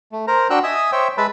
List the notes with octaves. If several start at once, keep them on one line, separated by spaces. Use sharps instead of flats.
A3
A#4 C5 A#5
D4 F#4 G5 E6 F#6
D#5 E5 G#5 D#6 E6
C5 C#5 E5 G5
G#3 B4 E5 A5 B5